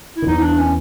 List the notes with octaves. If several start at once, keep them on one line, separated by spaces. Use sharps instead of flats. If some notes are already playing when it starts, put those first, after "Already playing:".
E4
D#3
E2 E3 D#4
D#4
D4
C#4